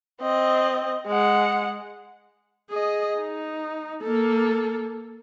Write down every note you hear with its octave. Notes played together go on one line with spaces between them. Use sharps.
C4 D#5
G#3 F#5
G#4 D#5
D#4
A#3 A4